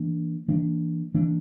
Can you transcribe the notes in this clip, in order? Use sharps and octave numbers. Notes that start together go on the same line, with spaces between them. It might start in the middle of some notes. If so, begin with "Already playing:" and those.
Already playing: E3 A#3 D4
E3 A#3 D4
E3 A#3 D4